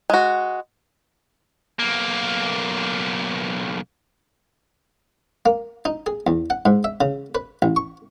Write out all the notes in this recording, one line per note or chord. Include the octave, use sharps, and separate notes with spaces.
G#3 F#4
B1 A#3
A#3
D#4
G#4
E2
F#5
G#2
E5
C#3
B4
A1
C#6